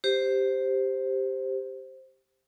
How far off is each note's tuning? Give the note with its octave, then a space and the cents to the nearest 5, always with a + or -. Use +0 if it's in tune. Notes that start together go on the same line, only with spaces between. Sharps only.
G4 +0 C5 +0